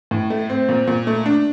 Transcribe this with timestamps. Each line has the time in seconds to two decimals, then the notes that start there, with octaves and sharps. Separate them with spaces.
0.11 A2
0.30 A3
0.50 C4
0.69 A#2
0.87 A#2
1.07 A3
1.26 D4